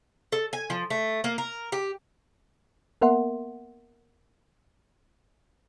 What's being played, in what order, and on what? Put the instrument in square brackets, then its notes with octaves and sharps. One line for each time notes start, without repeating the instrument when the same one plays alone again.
[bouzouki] A4
G#5
F3
A3
A#3
A#4
G4
[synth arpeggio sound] A#3 B3 A#4 E5 F#5 C6